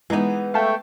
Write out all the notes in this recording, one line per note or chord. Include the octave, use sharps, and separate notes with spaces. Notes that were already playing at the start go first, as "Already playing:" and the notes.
E3 G#3 B3 D#4
A3 E5 F5 G5 A5 C#6